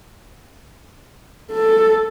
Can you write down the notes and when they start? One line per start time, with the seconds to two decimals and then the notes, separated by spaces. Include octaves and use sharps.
1.52 A4